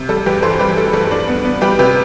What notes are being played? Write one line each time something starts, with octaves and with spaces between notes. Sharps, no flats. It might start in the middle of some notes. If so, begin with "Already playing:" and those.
Already playing: C3
G3 A4
G2 G4 B4
E3 A4 C5
G3 G4 B4
G3 A4
G2 A4
D4
B3
B3
G3 G4 B4
C3 G4 B4